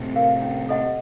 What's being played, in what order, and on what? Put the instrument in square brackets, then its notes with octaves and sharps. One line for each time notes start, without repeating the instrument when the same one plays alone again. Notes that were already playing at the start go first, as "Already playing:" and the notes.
Already playing: [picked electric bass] A2 C3
[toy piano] A#4 F5
C#4
A4 D#5 F#5